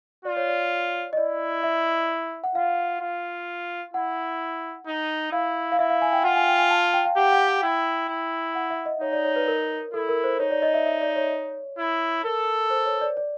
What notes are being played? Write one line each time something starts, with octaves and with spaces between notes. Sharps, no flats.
F4 D5
C#5
D5
D#5
E4 D5
E5
F#5
F4 F5
F4
E4 F#5
D#4
E4 F5
F5
E4 E5
F5
G#5
G5
F4 F#5
G#5
G5
G#5
A5
G5
F5
G4 F#5
F#5
G5
E4 G5
E4
F#5
E5
D#5
D#4 C#5
D5
C#5
B4
A#4
E4 A4
A#4
C5
D#4 C#5
D5
D#5
E5
E5
D5
C#5
E4
A4 A#4
C5
C#5
D5
D5